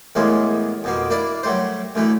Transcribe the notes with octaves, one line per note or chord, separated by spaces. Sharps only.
E2 A2 G3 G#3 A#3
F2 B2 A#3
A#3 D4 E4 D5
F#3 G3 A3 C5
D2 D3 E3 A3